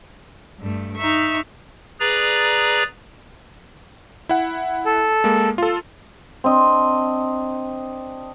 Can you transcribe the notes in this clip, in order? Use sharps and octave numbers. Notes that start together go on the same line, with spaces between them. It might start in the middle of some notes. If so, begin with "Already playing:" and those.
G2 A3
D#4 E5 C#6
G#4 B4 D5 A#5
E4 F#5
A4
G#3 A#3
F4 A4
C4 D4 D#5